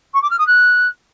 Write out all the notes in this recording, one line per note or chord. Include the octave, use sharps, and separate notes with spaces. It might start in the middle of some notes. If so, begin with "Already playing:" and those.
C#6
D6
F6
D#6
F#6